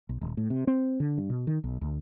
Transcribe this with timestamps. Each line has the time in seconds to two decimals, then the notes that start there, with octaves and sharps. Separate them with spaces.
0.09 B1
0.21 D#1
0.37 A2
0.50 C3
0.67 C4
1.00 D3
1.18 G2
1.30 B2
1.47 D#3
1.64 B1
1.81 D2